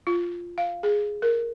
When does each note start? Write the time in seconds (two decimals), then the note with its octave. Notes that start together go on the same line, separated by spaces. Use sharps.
0.07 F4
0.58 F5
0.83 G#4
1.22 A#4